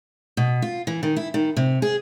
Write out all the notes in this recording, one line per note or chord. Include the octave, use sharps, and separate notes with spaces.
B2
F4
E3
D#3
E4
D#3
C3
G#4